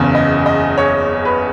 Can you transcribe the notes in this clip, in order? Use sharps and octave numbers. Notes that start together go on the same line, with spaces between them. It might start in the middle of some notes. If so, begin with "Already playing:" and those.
Already playing: F#1 E2 C#3
D#5
D#5
C#5
B4